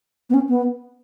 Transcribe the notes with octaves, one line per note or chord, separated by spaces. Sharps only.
B3
C#4
B3